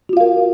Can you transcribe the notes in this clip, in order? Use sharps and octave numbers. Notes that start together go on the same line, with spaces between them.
F4 F#4 A#4 F5